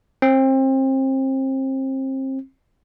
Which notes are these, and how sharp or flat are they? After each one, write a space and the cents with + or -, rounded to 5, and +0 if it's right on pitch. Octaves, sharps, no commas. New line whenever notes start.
C4 +30